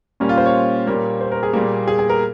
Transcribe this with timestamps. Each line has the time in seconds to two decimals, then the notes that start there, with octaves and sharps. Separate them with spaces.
0.20 A#2 G3 A#3 C#4
0.29 F4
0.38 C5
0.46 C#5
0.87 A#2 G3 A#3
1.21 C5
1.32 A#4
1.43 G#4
1.53 A#2 G3 A#3
1.87 G#4
1.99 G#4
2.09 A#4